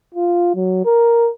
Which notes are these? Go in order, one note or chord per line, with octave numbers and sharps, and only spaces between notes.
F4
F#3
A#4